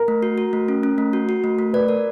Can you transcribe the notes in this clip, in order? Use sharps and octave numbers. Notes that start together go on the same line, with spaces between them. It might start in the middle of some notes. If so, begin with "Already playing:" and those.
Already playing: A#4
A3
F#4
F#4
A3
C#4
C#4
A3
F#4
F#4
A3
A3
B4 D5
A#4